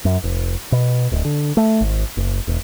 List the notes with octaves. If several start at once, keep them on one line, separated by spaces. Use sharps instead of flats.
F#2
F1
B2
D1
D3
A3
G#1
F#1
E1